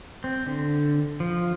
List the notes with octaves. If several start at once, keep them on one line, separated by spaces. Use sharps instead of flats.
C4
D3
F3